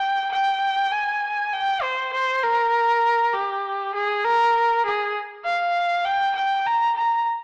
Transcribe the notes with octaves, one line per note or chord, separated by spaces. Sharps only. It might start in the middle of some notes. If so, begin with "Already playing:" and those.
Already playing: G5
G5
G#5
G5
C5
C5
A#4
G4
G#4
A#4
G#4
F5
G5
G5
A#5
A#5